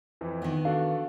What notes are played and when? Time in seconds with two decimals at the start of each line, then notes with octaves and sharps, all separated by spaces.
0.21 F2 E3
0.42 D#3 B3
0.65 D4 F#4 A4 F5